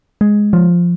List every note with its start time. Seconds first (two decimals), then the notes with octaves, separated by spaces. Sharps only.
0.21 G#3
0.53 F3